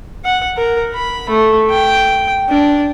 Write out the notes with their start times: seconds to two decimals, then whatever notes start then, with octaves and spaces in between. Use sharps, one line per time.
0.25 F#5
0.57 A#4
0.94 B5
1.29 A3
1.70 G5
2.49 D4